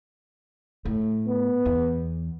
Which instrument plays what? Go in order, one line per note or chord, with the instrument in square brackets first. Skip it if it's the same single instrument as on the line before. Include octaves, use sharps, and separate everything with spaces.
[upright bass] A2
[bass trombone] B3
[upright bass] E2